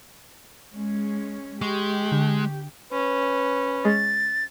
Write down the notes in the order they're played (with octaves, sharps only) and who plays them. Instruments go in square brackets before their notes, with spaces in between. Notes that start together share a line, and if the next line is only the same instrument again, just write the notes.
[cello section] G#3 C#4
[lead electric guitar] G#3 [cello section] G4 [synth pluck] C#6
[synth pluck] D3
[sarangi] C#4 [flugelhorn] B4
[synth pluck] G#3 [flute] A6